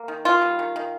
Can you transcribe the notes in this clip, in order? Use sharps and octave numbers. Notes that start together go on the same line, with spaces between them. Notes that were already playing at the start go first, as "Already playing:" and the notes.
Already playing: A#3
D#3
D#3 F4
G3
D#3
D#3